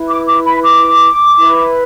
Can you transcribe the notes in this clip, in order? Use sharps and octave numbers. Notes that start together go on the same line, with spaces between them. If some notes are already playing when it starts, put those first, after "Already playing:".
Already playing: E4 B4
D6
D6
B5
D6
E4 B4